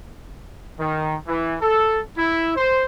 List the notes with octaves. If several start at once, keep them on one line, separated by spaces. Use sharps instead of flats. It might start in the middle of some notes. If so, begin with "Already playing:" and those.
D#3
E3
A4
E4
C5